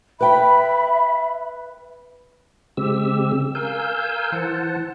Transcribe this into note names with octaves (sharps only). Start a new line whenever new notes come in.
B4 E5 G5 B5
C#3 G#3 C4 G4 E6
A#4 F5 G#5 E6 G6
E3 C5 F#5 A5